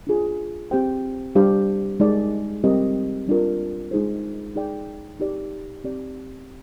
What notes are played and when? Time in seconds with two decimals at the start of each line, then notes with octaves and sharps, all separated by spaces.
0.07 D4 F4 G#4
0.71 C4 G4 C5 G5
1.35 G3 D4 G4 C5 F5
2.00 G#3 D#4 G#4 D5
2.64 G3 C4 G4 A#4 D#5
3.28 G3 D4 F4 A#4
3.91 G#3 D#4 G#4 C5
4.55 D#4 G#4 D5 G5
5.20 D#4 G4 D5
5.84 C4 G4 D5